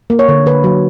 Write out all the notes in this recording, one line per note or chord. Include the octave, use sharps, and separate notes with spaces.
A#3
C#5
D3
D3 B4
F#3